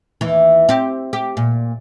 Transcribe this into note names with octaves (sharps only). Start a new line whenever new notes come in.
D#2 E3
C4 G4
G4
A#2